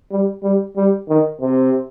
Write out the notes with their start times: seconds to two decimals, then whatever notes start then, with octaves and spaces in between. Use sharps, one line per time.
0.12 G3
0.43 G3
0.77 G3
1.09 D#3
1.41 C3